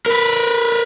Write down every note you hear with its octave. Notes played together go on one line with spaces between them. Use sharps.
A#4 B4